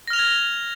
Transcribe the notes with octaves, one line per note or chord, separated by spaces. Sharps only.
F6 G#6 A#6 F7 G7